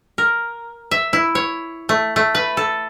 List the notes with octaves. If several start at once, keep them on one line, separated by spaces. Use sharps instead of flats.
A#4
E5
E4
C#5
A3
A3
B4
A4